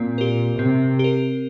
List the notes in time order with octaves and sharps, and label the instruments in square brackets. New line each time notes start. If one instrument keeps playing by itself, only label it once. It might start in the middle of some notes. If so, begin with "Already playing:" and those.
Already playing: [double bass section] A#2 [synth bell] C4
[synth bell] G4 A#4
[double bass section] C3 [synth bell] C4
[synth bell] G4 A#4